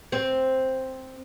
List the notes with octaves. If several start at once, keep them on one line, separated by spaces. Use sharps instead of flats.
C4